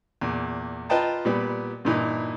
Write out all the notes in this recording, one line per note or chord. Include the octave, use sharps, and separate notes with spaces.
E2 A#2
F4 B4 D#5 G5 A5 A#5
A#2 G3 B3
G2 A#2 E3 D#4